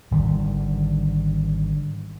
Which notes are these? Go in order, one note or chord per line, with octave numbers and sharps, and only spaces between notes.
G#1 D3 D#3 G3